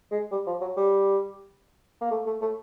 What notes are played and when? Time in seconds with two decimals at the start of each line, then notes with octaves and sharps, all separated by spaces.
0.12 G#3
0.32 G3
0.46 F3
0.61 F#3
0.77 G3
2.01 A#3
2.11 A3
2.26 A3
2.41 A3